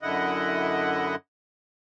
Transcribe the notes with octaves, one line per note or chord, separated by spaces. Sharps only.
F#2 D3 E4 D#5 F#5